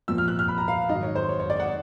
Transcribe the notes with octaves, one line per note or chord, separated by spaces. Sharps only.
A#2 F3 E6
F6
F#6
F6
B5
A#5
F5
G#2 D#3 F#3 D#5
C#5
C5
C#5
C#5
D5
F#5